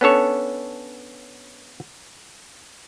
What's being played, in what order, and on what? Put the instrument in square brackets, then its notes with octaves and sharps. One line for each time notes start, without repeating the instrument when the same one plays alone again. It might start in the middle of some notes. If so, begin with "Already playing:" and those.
[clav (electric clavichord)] B3 C#4 D4 A4 C#5